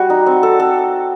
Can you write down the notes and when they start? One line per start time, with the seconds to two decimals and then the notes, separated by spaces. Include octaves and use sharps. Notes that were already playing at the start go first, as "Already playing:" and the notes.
Already playing: G3 F#4
0.10 D#4
0.26 C4
0.43 A4
0.60 A4